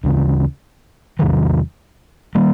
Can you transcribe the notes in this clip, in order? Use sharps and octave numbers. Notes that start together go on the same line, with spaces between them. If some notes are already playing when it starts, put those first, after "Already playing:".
D2 C#3 E3
E2 C3 D#3 F#3
D#3 G3 A#3